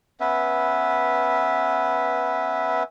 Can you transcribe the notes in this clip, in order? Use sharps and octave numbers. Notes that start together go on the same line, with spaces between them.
B3 C#4 B4 E5